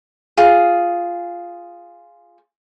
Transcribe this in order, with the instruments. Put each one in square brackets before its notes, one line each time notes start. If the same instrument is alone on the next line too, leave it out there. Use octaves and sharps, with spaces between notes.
[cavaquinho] F4 G#4